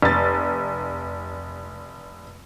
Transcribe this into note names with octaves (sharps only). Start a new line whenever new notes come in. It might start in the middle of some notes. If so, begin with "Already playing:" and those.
F1 A6